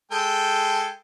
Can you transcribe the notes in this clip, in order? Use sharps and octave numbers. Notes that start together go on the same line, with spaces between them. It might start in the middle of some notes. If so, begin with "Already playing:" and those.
G#3 A4 G5